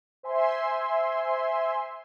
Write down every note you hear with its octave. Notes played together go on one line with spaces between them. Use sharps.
C5 E5 G#5 C6